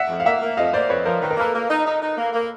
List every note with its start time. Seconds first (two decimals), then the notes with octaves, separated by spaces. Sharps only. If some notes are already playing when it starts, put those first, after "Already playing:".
Already playing: E5 F#5
0.09 F2
0.20 F5
0.25 A#3 E5 F#5
0.41 A#3
0.57 F2 D#5 F5
0.73 A#3 C5 D5
0.89 F2 B4 C#5
1.05 F3 A#4 C5
1.21 D#3 B4
1.31 A#4
1.37 A#3 A4 B4
1.54 A#3
1.69 D#4
1.86 D#4
2.02 D#4
2.17 A#3
2.33 A#3